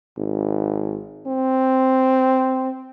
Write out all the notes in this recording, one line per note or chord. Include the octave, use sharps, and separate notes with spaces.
G#1
C4